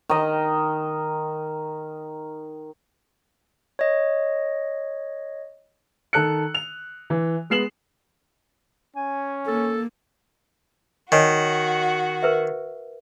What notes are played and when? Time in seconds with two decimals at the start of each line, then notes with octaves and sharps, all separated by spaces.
0.09 D#3 D#5
3.79 C#5 D#5
6.13 D#3 A4 F#6 C#7
6.55 F7
7.10 E3
7.50 G#3 B3 C7 E7 F#7
8.96 C#4 G#5
9.47 A#3 A4
11.12 D#3 F#4 C#5 D#5 G#5
12.23 A#4 B4 E5